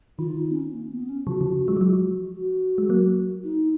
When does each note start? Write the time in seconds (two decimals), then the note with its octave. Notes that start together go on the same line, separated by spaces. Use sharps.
0.18 D#3 F4
0.37 D#4
0.51 B3
0.55 C#4
0.73 A#3
0.91 B3
1.09 C#4
1.27 C#3 F3 F#4
1.41 C#3 F3
1.68 F3 G#3
1.77 F#3
1.81 F3 G#3
2.35 F#4
2.78 G#3
2.89 F#3 A#3
3.44 D#4